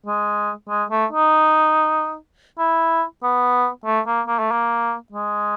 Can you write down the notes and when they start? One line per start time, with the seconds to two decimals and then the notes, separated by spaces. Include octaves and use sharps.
0.06 G#3
0.69 G#3
0.91 A3
1.12 D#4
2.59 E4
3.23 B3
3.86 A3
4.07 A#3
4.27 A#3
4.39 A3
4.51 A#3
5.12 G#3